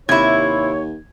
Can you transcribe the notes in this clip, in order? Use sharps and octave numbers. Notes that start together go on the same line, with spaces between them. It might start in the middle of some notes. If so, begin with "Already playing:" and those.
D#2 C3 E4 C#5 G#6